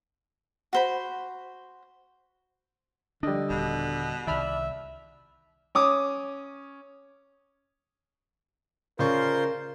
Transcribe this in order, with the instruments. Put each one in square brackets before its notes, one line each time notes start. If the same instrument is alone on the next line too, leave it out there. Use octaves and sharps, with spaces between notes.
[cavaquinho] F#4 C5 B5
[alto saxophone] D3 [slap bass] F3 D4 [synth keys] G3 D#5
[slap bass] D#1 [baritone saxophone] B2
[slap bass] C2 D#3 [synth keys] D5 B5 F6 [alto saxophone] E5
[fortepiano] C#4 D6 D#6
[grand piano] C#3 D5 C#6 [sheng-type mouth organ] F4 C5 C6 [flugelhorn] A#4